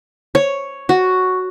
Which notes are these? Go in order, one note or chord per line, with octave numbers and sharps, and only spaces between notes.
C#5
F#4